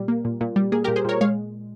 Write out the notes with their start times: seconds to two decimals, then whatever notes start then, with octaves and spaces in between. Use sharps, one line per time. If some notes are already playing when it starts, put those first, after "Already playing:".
Already playing: A#2 G3
0.08 A#3
0.25 A#2
0.41 A#2
0.56 G3
0.72 A#3 G#4
0.84 A#2 G4 A#4
0.96 G#4 C5
1.05 A#2 A#4 C#5
1.21 G#3 C#5 F5